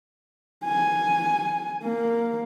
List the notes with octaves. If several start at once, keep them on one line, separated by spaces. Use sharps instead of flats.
G#5
A#3